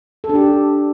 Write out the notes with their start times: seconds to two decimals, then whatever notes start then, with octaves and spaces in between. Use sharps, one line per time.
0.24 A4
0.29 D4
0.35 G4